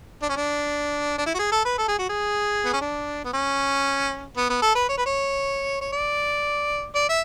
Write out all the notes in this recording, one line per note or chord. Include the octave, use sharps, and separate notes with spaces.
D4
C#4
D4
D4
E4
F#4
G#4
A4
B4
A4
G#4
F#4
G#4
B3
C#4
D4
B3
C#4
B3
B3
A4
B4
C#5
B4
C#5
C#5
D5
D5
E5